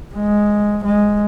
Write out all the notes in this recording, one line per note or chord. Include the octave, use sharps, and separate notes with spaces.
G#3
G#3